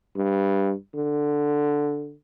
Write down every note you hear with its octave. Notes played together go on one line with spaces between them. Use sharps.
G2
D3